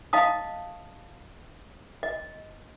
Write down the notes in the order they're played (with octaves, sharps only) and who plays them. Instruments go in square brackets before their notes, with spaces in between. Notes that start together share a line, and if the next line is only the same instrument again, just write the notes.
[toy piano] D#5 F5 A5 D#6
D#5